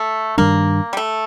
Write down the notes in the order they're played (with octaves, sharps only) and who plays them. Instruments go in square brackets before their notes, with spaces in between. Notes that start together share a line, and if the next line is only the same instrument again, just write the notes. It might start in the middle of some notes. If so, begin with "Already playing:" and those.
Already playing: [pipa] A3
[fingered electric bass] G2 D#3 G3 D4 [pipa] A#3
[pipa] G3
A3